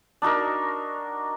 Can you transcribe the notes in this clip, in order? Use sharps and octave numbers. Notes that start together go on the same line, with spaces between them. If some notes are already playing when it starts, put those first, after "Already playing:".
D4 D#4 F#4 A#4